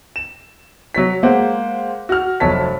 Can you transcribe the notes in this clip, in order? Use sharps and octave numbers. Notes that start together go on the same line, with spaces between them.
E7
F#3 C#5 B6
G#3 A#3 C5 F#5
F#4 F6
F1 F#3 C#5 A5 B6